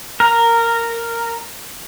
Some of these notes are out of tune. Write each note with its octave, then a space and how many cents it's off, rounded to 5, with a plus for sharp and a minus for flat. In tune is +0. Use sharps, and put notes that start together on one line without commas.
A#4 -10